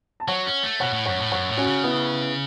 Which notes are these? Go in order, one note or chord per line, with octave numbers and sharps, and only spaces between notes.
A5
F#3 C#5 F#5
C#4
A3
B2 C#5 F#5
A2
F#2 C#5 F#5
A2
F#2 C#5 F#5
A2
C#4 F#4
C#3
B3 E4